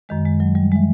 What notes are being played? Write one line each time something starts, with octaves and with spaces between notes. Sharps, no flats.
F#2 D#3 G#3
G#3
F#3
G3
E3 G#3